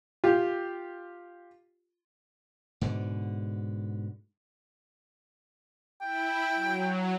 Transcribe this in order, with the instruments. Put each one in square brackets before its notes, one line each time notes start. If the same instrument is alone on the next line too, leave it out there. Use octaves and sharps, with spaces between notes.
[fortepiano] F4 G4
[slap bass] G#2 B2 D3
[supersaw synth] E4 [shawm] G5
[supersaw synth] F#3